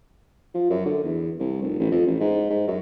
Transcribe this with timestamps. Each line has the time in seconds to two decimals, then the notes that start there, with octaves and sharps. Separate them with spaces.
0.54 F3
0.70 F#2
0.85 D3
1.04 E2
1.39 C2
1.62 F1
1.79 A1
1.91 F2
2.06 A1
2.20 G#2
2.50 G#2
2.67 F#2